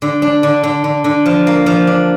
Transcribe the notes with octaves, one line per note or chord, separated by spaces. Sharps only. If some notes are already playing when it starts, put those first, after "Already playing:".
D3
D4
D3
D3
D3
D3
F3
A#3
F3
D4